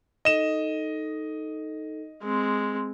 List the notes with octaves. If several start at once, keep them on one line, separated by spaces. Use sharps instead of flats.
D#4 A4 D#5 E7
G#3 C4